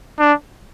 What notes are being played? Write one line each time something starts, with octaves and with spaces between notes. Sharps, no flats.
D4